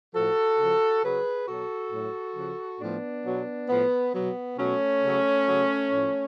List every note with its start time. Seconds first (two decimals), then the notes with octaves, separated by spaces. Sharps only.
0.14 A2 F3 F#4 A4
0.59 C#3 F3
1.03 C#3 F#3 G#4 B4
1.47 B2 F#3 F#4 A4
1.92 A2 F#3
2.36 C#3 F3
2.80 A2 F3 B3 D4
3.25 B2 F#3
3.69 A2 F3 B3
4.14 B2 F#3 B3
4.58 B2 F#3 A3 C#4
5.03 C#3 F#3
5.48 C#3 F#3
5.91 A2 F3